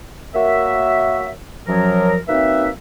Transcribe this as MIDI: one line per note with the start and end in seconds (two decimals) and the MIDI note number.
0.35 1.31 58
0.35 1.31 66
0.35 1.31 70
0.35 1.31 73
0.35 1.31 76
1.67 2.17 42
1.67 2.17 53
1.67 2.17 54
1.67 2.17 70
2.28 2.69 54
2.28 2.69 58
2.28 2.69 60
2.28 2.69 63
2.28 2.69 71
2.28 2.69 76